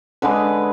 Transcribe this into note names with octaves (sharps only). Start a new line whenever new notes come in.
D3 G#3 B4